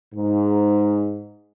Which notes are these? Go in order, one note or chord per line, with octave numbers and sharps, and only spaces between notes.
G#2